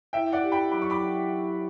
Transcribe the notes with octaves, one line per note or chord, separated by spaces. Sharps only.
E4 E5 G5
D5 F#5
G4
G5 B5
F#3 B5 D6
C#6
B5 D6